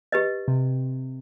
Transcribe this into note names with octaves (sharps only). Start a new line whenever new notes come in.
G4 B4 D#5
C3